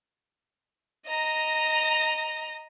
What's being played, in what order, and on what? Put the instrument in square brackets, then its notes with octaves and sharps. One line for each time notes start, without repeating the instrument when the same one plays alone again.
[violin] D#5 A#5